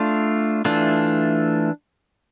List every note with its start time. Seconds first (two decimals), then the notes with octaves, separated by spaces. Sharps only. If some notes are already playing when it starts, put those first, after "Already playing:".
Already playing: A3 D4 F4
0.65 E3 A3 D4 F4